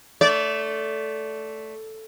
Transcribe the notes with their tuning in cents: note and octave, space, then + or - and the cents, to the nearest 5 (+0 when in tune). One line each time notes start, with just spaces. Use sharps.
A3 +0 D5 -25